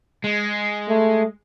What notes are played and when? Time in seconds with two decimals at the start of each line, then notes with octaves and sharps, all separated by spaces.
0.24 G#3
0.89 A3